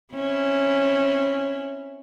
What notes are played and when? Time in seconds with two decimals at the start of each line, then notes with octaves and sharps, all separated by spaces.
0.14 C4 C#4 E4